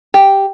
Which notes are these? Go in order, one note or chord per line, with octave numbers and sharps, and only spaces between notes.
G4